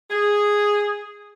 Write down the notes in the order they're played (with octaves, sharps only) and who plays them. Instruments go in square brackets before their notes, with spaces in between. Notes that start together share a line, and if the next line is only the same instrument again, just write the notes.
[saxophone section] G#4